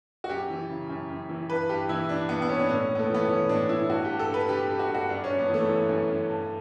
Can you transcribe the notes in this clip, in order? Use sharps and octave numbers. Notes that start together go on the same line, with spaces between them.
F#4
F#2 G4
E3
C#3
F#2
F#2
E3
G2 B4
G2 G4
E3 E4
E3 D4
G2 B3
B3
G2 C#4
D4
A2 C#4
A2
B3
A3
E3
B3
E3 C#4
A2 D4
A2 E4
G2 F#4
G4
G2
A4
D3 B4
D3 G4
G2 G4
F#4
G2
F#4
F#2 D4
C#4
F#2
B3
E3 A3
E3
F#2
F#2
G2